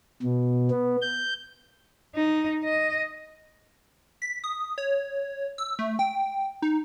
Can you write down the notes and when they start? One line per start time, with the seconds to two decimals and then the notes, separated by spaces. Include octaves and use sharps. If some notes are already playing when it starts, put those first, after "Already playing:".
0.22 B2
0.71 B3
1.02 G6
2.16 D#4
2.64 D#5
4.22 B6
4.44 D#6
4.78 C#5
5.58 E6
5.79 A3
5.99 G5
6.62 D#4